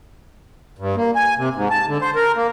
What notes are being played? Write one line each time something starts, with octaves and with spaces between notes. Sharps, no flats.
G2
A#3
G#5
C3
G#2
A5
D3
C5
A#4
A#3